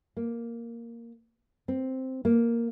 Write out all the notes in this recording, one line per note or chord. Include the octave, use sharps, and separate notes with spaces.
A#3
C4
A#3